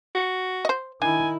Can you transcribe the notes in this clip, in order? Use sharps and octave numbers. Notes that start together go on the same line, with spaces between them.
F#4
C5 D#5
D#3 D4 E4 G#5